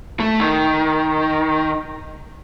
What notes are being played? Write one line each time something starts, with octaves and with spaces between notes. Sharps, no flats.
A3
D#3